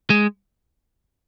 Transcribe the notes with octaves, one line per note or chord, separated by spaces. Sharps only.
G#3